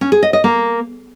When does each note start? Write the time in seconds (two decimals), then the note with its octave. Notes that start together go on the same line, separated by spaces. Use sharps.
0.01 C#4
0.12 G#4
0.23 D#5
0.33 D#5
0.44 A#3